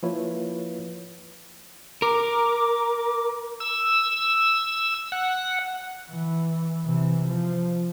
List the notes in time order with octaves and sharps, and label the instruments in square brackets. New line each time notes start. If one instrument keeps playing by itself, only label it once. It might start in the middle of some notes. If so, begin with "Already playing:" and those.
[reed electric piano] F3 A#3 E4 F4 B4 C#5
[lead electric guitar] A#4 [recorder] D6
[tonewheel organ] E6
F#5
[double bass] E3
C3 E3
F3